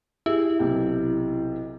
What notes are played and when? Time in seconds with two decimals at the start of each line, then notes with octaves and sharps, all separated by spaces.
0.26 E4 G4 G#4
0.59 B1 C3 G5